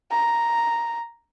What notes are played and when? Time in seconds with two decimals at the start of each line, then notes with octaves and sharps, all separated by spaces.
0.11 A#5